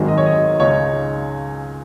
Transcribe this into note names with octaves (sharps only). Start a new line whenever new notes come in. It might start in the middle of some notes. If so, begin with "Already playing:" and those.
Already playing: G#1 F#2 D#3 G#3
D#5
C#5
D#5
C#2 C#3 G#3 D#4 C#5